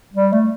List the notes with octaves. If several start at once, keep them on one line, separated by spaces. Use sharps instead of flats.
G3
A3